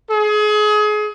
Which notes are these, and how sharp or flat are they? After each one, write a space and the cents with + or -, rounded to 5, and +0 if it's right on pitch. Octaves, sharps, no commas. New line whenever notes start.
G#4 +30